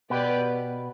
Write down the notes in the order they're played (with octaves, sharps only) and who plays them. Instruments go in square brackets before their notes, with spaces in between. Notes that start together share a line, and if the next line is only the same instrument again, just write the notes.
[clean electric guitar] B2 B3 [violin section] G4 B4 D5